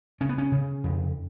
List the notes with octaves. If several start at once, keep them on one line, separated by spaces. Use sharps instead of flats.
C#3 C#4
B3
C#4
C#3
F2